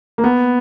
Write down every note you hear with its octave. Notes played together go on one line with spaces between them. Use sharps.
A#3
B3